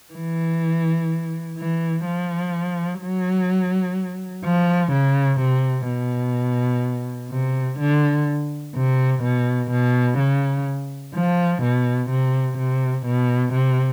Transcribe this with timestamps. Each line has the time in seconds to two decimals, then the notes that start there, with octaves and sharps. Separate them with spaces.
0.14 E3
1.58 E3
2.05 F3
3.01 F#3
4.45 F3
4.92 C#3
5.41 C3
5.88 B2
7.32 C3
7.80 D3
8.75 C3
9.23 B2
9.71 B2
10.19 C#3
11.15 F3
11.62 B2
12.10 C3
12.58 C3
13.06 B2
13.54 C3